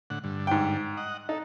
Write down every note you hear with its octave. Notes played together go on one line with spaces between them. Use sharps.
A2 D3 F#5
G2 D3
G#2 G5
D#5 F#5
D#4 A4